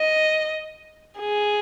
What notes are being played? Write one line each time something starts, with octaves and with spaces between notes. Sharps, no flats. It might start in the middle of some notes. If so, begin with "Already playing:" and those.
Already playing: D#5
G#4